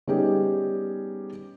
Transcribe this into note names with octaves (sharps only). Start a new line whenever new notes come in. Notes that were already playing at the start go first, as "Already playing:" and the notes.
G3 B3 C#4 D#4 G4 G#4